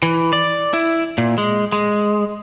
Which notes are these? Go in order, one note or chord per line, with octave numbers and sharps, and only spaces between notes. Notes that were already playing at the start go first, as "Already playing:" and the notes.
E3
D5
E4
A#2
G#3
G#3